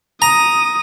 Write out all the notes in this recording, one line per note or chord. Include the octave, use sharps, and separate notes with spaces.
A#5 D#6